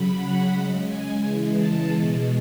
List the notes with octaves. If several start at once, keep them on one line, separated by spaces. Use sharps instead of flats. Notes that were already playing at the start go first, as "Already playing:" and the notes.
Already playing: C#3 F#3 B5
F#5
C#3 G#3
G#5
C#3 E3 G#3
A5
B2 G#3